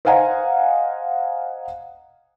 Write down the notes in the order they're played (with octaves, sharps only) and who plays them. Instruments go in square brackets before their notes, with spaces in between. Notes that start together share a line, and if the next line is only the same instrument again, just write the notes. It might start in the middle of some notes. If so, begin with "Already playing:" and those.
[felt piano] C5 D#5 F5 F#5 G#5 A#5